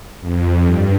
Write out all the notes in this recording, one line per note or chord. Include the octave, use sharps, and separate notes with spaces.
F2
G2